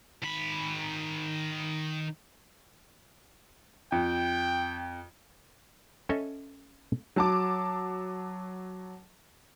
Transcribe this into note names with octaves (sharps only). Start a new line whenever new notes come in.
D#3 B5
F2 G5
C#4 A4 C#5 D#5 E5 G#5
F#3 A5 D6